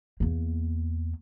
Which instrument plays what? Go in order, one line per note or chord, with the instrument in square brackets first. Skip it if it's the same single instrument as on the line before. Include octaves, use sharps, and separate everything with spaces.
[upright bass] E2 A#3